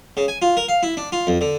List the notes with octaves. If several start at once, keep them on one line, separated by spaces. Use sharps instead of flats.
C#3
G#5
F4
A#4
F5
E4
D4
F4
F2
D3